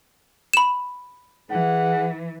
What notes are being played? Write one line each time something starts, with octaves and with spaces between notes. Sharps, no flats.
B5 E7
E3 G#4 F#5